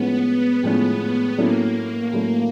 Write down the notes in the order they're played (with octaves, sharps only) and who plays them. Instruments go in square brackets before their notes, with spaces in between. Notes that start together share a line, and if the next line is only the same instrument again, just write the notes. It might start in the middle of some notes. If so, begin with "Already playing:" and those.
Already playing: [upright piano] A2 F3 G#3 C#4 [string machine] B3
[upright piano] A2 F3 G#3 C#4
[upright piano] A2 F#3 A3 C#4 E4 [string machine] A#3
[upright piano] A2 F#3 A3 C#4 E4